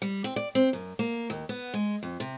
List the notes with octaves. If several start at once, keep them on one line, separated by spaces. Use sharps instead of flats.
G3
C4
D5
C4
F#2
A#3
D#2
B3
G#3
F2
C3